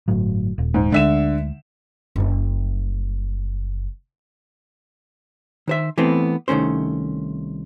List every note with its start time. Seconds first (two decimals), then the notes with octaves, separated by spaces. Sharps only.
0.08 G1 A2 F#3
0.58 D#1
0.74 G#2
0.92 D2 D3 G#3 E5 E7
2.16 F#1 G3
5.68 D#3 C5 E5
5.98 E3 A3 B3 C4
6.48 C2 D#3 A3 C#4 C5